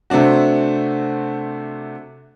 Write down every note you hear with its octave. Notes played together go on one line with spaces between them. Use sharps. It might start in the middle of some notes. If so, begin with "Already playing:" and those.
C3 A3 C4 D4 F#4